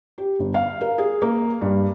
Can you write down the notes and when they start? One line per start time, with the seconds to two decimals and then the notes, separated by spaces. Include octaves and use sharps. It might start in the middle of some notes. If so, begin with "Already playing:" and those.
0.18 G4
0.39 G1
0.54 F5
0.81 A#4
0.98 G#4
1.22 A#3
1.61 G2